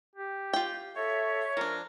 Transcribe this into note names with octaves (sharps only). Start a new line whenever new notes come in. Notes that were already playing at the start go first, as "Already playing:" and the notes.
G4
F4 G5
A4 C#5 E5
F3 D4 A#4